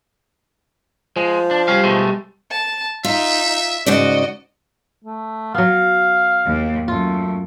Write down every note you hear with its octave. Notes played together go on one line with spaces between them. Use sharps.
F3 G#3
D4
G3 C#4 G4 F5
B2 G#3 A3
A5
D#4 F4 E5
G#2 C#3 F#4 D5 D#5
A3
F#3 B3 F5
D#2
F#2 A3 F4